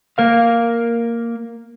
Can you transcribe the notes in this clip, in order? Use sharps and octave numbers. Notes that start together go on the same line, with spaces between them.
A#3 A#4 F5